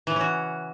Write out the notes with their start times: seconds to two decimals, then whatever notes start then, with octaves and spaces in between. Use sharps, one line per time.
0.07 E3
0.12 C#3
0.16 C#4
0.21 F#4